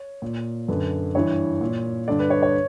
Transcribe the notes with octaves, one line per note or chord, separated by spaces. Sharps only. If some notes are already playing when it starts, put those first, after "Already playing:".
Already playing: C#5
A#2
F#2 D3 B4
G2 E3 C#5
A#2
G2 D3 D5
B4
C#5
C#5